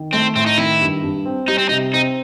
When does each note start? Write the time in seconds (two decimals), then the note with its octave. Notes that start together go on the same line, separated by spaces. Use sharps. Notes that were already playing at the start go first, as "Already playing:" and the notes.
Already playing: D#3
0.13 A3 C4
0.36 A2 C4
0.46 D#4
0.58 D#3 E4
0.81 G2
1.03 G2
1.25 C4
1.48 G3 D#4
1.58 C4
1.69 C3 D#4
1.94 C4 D#4